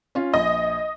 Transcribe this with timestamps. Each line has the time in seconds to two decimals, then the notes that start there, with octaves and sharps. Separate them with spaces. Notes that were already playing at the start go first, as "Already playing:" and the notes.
0.15 C#4 F4
0.34 A#1 D#5